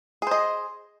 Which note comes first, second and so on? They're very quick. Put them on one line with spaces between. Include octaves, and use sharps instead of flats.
G#4 C5 D#5